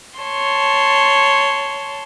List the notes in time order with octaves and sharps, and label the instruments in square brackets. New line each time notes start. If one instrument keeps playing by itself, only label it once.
[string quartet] C#5 A5 C6